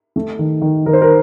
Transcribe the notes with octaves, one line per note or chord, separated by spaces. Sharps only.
A3
D#3
D#3
D#3 A#4
C5
A#4